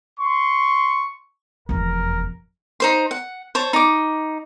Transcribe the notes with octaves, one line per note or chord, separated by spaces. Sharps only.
C6 C#6
F1 E2 A#4
D#4 C5 C6
F#5
C5 C#5 A5
D#4 D6